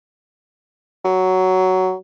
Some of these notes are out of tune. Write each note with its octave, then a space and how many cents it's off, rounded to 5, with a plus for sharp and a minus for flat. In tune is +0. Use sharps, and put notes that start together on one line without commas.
F#3 +10